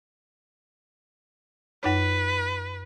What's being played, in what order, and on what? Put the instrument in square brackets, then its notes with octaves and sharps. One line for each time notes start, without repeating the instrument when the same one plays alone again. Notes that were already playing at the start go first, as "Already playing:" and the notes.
[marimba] F#2 D#4 C#5 [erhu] B4